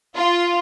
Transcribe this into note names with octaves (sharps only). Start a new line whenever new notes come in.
F4